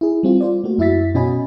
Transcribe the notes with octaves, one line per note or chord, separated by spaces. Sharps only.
E4 G#4
G3 C4 F4
F4 C5 D5
A3 A#3 F#4
F#2 E4 F#4 E5 A6 B6
B2 C#4 F#4 D#5 G#5 B5